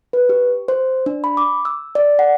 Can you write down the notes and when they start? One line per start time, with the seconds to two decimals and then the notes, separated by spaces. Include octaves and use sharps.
0.13 B4
0.29 G4
0.68 C5
1.06 D4
1.24 B5
1.37 D6
1.65 E6
1.95 D5
2.19 F#5